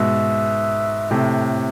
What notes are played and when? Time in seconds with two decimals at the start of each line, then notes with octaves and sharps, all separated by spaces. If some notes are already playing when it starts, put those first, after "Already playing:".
Already playing: G#2 B2 E5
1.11 A2 C3 A4